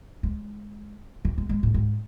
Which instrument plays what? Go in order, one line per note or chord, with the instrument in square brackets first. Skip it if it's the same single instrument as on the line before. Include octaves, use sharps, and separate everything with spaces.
[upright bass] G#3
E3
G#3
G#3
A2
G#2